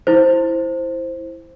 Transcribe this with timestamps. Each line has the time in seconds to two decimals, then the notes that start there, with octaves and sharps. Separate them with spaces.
0.07 E4 C5